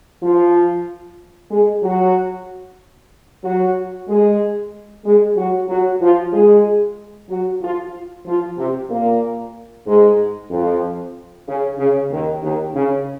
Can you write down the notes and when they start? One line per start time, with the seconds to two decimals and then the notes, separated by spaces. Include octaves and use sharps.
0.22 F3 F4
1.50 G#3 G#4
1.82 F#3 F#4
3.43 F#3 F#4
4.08 G#3 G#4
5.04 G#3 G#4
5.35 F#3 F#4
5.68 F#3 F#4
6.00 F3 F4
6.32 G#3 G#4
7.28 F#3 F#4
7.61 F3 F4
8.25 F3 F4
8.58 C3 C4
8.89 A#2 A#3
9.85 G#2 G#3
10.50 F2 F3
11.46 C#3
11.78 C#3
12.10 D#2 D#3
12.42 D#2 D#3
12.74 C#3